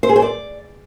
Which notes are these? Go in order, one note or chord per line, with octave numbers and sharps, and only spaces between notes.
C5
G#4
C5
D5